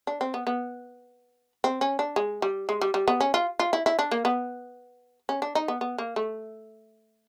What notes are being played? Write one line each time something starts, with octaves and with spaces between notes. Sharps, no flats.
D4
C4
B3
B3
C4
C#4
D4
G#3
G3
G#3
G3
G3
B3
C#4
F4
F4
E4
E4
D4
A#3
B3
C#4
D4
D#4
B3
B3
A#3
A3